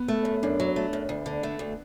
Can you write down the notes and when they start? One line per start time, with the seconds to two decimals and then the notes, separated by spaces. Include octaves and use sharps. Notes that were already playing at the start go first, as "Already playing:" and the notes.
Already playing: B3
0.08 A3
0.25 F#2
0.43 F#2 D4
0.60 F#3
0.76 A3
0.93 F#2
1.09 D2
1.26 D3
1.43 A3
1.59 D2